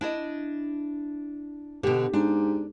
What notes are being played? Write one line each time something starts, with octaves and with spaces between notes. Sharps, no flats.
D4 E4 D#5
B2 D3 G4
G#2 D4